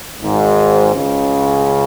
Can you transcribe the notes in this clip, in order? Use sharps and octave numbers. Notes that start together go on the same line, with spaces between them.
G#1 G#2
C#2 C#3